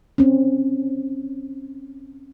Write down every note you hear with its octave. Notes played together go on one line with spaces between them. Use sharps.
C4 C#4